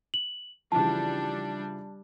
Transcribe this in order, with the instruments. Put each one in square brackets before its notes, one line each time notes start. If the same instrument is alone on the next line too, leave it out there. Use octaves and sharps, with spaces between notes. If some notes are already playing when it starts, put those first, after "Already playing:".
[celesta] F#7
[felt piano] C#3 E3 F3 [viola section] G3 D4 [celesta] A5